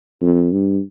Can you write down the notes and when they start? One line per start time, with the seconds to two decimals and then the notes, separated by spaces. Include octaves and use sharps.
0.21 F2
0.52 G2